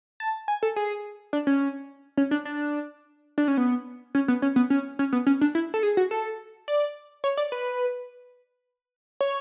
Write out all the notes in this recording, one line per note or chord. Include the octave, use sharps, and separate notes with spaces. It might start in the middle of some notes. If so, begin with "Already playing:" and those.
A5
G#5
A4
G#4
D4
C#4
C#4
D4
D4
D4
C#4
B3
C#4
B3
C#4
B3
C#4
C#4
B3
C#4
D4
E4
A4
G#4
F#4
A4
D5
C#5
D5
B4
C#5